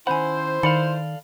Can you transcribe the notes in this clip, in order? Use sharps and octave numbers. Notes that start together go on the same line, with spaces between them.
D#3 C#4 E4 C5 F#5 G#5 B5
D#3 A4 D5 F5 B5 C#7